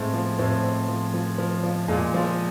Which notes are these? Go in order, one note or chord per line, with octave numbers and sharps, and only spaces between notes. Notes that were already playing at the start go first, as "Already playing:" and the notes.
Already playing: A2 G#3 C4
F3
A2 C4
C4
F3
F3
F3
F3
A#2 G#3
F3